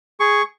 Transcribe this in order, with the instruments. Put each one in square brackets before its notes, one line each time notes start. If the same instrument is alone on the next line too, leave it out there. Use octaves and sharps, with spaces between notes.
[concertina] G#4 C#6